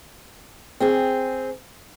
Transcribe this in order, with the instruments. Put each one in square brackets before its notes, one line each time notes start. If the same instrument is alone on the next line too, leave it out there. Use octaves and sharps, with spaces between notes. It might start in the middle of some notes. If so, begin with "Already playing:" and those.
[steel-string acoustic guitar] C4 G#4